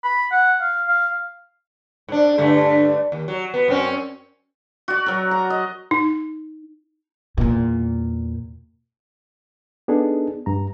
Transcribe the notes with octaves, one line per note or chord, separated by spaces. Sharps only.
B5
F#5
F5
F5
G#2 D4
G2 D3 A3
D#2
F#3
B3
F#2 C4 C#4
F#4 D5
F#3 A#4
A#5
D#5
D#4
E2 A#2
B3 D4 D#4 G#4 A4
G2 A#5